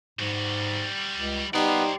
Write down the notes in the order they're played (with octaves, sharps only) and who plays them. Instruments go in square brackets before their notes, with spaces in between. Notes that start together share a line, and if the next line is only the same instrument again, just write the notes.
[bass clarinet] G#2 [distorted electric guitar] G3 F#4
[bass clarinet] C#2
[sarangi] G3 [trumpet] B3 [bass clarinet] D#4 [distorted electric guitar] C5 D5